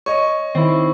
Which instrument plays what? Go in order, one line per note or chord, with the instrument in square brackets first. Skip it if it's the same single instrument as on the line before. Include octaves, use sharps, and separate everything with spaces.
[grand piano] C#5 D#5 [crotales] C#6
[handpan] D#3 [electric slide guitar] C4 E4